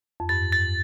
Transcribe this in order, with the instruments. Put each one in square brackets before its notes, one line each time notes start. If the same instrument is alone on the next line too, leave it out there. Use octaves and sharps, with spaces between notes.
[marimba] F2
[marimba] G2 [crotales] A6
[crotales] A6